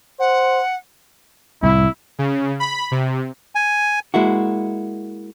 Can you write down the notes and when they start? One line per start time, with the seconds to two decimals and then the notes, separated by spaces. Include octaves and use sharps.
0.19 C5 F#5
1.63 C2 A2 E4
2.19 C#3
2.60 B5
2.91 C3
3.55 G#5
4.14 G#3 A#3 E4 F#4